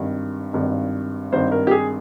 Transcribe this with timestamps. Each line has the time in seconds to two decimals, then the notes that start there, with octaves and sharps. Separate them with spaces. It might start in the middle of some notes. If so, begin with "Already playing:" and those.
Already playing: G#1 G2 D#3
0.53 G#1 G2 D#3
1.32 G#1 G2 D#3 C5
1.52 A#4
1.67 G4
1.71 G#4